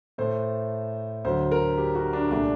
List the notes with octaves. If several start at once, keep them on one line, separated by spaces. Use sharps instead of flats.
A2 A3 C5
D2 D3 F#3 C5
A#4
G4
F#4
D4
C2 A#2 A3 D4